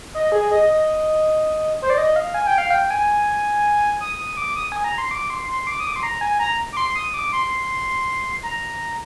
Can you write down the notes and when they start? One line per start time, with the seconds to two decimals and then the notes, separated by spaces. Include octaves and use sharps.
0.14 D#5
0.32 G#4
0.51 D#5
0.69 D#5
1.82 C5
1.90 D5
1.98 D#5
2.16 F5
2.34 G#5
2.47 G5
2.58 F5
2.70 G5
2.90 G#5
4.01 D#6
4.18 D#6
4.37 D6
4.56 D#6
4.72 G#5
4.84 A#5
4.98 C6
5.11 D6
5.30 C6
5.48 C6
5.67 D6
5.80 D#6
5.87 D6
5.96 C6
6.03 A#5
6.21 G#5
6.39 A#5
6.73 D6
6.77 C6
6.96 D#6
7.14 D6
7.33 C6
8.43 A#5